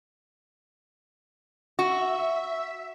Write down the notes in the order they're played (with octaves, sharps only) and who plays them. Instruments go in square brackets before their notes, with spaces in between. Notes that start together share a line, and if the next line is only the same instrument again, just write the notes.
[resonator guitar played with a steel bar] F#4 [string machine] E5